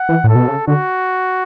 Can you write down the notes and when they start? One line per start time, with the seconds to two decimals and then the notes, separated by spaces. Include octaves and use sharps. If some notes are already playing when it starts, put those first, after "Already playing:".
Already playing: F#5
0.09 E3
0.24 A2 A4
0.35 B2
0.48 C#3
0.67 D3 F#4